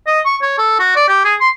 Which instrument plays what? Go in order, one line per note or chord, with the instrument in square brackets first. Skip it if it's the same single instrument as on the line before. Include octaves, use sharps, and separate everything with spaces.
[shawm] D#5
C#6
C#5
A4
F#4
D5
G4
G#4
C6